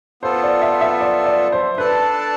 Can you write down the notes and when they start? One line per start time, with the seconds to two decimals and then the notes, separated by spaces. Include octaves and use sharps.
0.23 B3 F4 A4 C5
0.43 D5
0.62 E5
0.81 E5
1.01 D5
1.26 D5
1.52 C5
1.78 D4 A4 B4 D5 A5